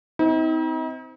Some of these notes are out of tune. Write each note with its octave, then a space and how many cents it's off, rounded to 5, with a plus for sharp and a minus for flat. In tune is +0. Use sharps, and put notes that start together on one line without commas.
C4 -15 D#4 +45